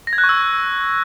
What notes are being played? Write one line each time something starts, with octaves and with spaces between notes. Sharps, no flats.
A#6
G#6
F#6
C#6
E6